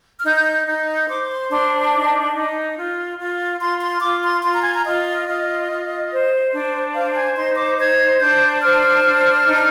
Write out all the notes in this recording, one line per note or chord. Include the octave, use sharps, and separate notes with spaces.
F6
D#4 G6
D#4
C5 D6
C6
D4 C6
D#4
D#4
F4
F4
F4 C6
C6
F4 D6
C6
F4 C6
A#5
G#5
A#5
F4 D#5
F4
F4
C5
D4
C5 F5
G#5
D#4 C6
D6
C5 G#6
D4 G6
C5 F6
D4
D#4